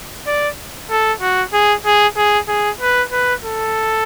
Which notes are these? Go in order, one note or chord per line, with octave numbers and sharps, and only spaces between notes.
D5
A4
F#4
G#4
G#4
G#4
G#4
B4
B4
A4